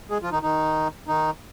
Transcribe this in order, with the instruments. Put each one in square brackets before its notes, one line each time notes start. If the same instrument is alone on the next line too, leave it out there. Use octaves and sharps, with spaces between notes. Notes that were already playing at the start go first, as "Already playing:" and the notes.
[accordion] G#3 G#4
F3 F4
D#3 D#4
D#3 D#4
D#3 D#4